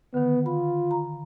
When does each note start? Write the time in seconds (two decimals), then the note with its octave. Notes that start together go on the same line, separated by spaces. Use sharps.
0.14 D3 D#3 B3
0.46 F4 B5
0.91 A#5